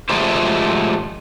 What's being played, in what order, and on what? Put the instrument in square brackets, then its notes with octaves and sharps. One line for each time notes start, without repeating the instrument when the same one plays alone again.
[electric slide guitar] F3 F#3 G#3 A3 G4 C5